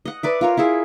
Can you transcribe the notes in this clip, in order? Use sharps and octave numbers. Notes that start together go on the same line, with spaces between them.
D#5 F#5
B4 D5 E5
F4 A#4 C#5
E4 F4 G#4 E5